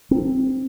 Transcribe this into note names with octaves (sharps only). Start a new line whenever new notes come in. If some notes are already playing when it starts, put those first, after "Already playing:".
C4